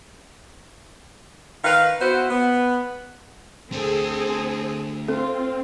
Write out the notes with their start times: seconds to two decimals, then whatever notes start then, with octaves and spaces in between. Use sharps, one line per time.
1.64 D#3 B4 F5
2.01 B3 E4 F#4 C5
2.31 B3
3.72 A3 C4 D4 G#4 A4
5.08 C4 F4 A4